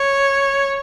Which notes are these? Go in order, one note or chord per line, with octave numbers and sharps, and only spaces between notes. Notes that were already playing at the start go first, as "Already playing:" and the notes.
Already playing: C#5